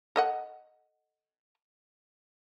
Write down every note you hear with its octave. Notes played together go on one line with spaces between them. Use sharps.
A4 D#5 F#5